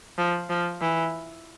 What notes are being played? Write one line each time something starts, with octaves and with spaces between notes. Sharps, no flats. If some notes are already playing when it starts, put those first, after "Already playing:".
F3
F3
E3